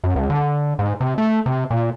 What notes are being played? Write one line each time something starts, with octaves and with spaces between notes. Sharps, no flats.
F#2
C#2
D3
G#2
C3
A3
C3
A#2